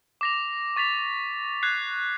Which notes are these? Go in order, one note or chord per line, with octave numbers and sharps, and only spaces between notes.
D6 A#6 F7
C#6 A6 B6 F7
F#6 G#6 C7